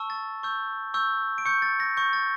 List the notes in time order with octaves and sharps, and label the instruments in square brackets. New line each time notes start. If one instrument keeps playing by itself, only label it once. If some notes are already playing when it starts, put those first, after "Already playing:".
Already playing: [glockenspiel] A5 C#6 E6
A6
C#6 E6 G6
C#6 E6 G6
D7
C#6 G6 C#7
A6
A#6
C#6 G6
A6